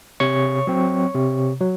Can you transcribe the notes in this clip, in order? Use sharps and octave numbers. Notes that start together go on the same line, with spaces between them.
C3 C#5 C#6
F#3 C4
C3
F#3